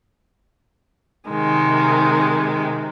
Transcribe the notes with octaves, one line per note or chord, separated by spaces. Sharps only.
C3 D#3 G#3